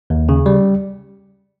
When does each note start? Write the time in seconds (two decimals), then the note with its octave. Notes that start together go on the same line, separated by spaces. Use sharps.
0.10 D#2
0.29 C#3
0.46 G3